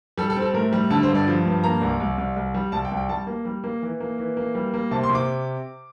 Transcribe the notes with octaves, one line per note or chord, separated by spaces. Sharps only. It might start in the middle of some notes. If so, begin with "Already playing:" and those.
G3 A4
A4
C4
A4
A2 A#4
G3
D3 A5
C5
G2
D5
F3
G2
A#3 A#5
C2
C2
C2
C2
G3
C2 A5
G5
C2
G5
G3 A5
A#3
G3
A#3
E3
A#3
E3
A#3
G3
A#3
C3 A5
C6
C3
D6